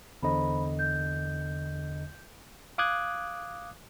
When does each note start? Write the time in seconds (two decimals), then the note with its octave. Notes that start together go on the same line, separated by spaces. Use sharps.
0.23 E2 D3 C5 D#5 A#5 B5
0.79 G6
2.78 F5 D6 D#6 F#6 G#6